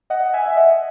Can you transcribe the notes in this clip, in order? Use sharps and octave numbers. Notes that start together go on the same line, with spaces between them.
D#5 F#5
E5 G#5
E5
D#5 F#5